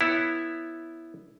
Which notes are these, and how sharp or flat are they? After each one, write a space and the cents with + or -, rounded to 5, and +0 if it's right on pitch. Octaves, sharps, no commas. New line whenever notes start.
B3 +0 E4 +0 C#5 +0